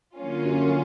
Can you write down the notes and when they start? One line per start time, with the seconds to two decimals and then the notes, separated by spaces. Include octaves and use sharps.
0.15 D3 F#3 A#3 C#4 F4
0.44 F#2